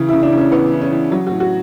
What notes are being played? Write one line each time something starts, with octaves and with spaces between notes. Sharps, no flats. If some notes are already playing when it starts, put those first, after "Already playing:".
Already playing: C#3 E3
E4
C#3
D4
C#3
C#4
E3 B3
E3
C#4
E3
F#3
F#4
A2
F#4